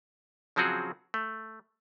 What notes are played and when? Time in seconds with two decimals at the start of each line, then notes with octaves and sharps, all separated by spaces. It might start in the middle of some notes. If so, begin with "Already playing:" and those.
0.56 C#3 F3 F#3 C4 F#4 G#4
1.14 A3